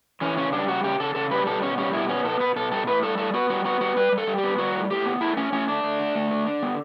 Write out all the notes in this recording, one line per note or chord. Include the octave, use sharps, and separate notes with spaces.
E3 C#4
C#3 C#4
G3 D4
C#3 F#4
C#3 G4
C#3 A4
C#3 A4
G3 B4
B2 A4
B2 C#4
G3 C#4
B2 E4
B3 C#4
B2 A4
B2 B4
B2 A4
G3 A4
A2 B4
G3 A4
A2 A4
B3 F#4
G3 F#4
B3 F#4
G3 F#4
G3 B4
G3
A4
G3
G4
B3
G3 F#4
A2
A2 G4
B3
A3 E4
A3 C#4
A3 C#4
A3 D4
A3
D3
A3
D3
D3
B3